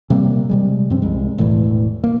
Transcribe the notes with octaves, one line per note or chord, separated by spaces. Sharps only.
C3 G3 A#3 C4
C3 G3 G#3
G2 F3 C4 C#4
C2 G#3
E1 A2 E3 A3
A#3